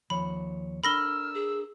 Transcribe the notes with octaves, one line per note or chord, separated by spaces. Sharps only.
D#2 F3 C#5 B5
D4 A4 A#4 B5 E6 F6 A#6 G7
G#4